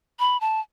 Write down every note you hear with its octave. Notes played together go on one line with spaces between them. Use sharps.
B5
A5